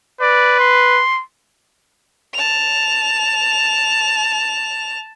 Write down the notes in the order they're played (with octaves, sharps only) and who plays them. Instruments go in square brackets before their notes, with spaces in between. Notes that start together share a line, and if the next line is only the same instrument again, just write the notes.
[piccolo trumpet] B4 [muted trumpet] D5
[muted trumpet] C6
[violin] A5 F7